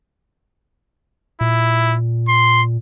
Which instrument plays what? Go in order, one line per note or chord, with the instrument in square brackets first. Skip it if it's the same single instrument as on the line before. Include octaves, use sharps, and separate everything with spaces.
[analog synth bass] A#2 [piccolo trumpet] E4
[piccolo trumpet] C6